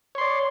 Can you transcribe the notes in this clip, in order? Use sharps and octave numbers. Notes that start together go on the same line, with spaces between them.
C#5 D5 C6